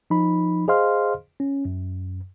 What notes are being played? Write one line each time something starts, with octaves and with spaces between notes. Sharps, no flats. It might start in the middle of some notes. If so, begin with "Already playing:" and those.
F3 D#4 B5
G#4 C5 D#5 F5 C6 F6
C#4
F#2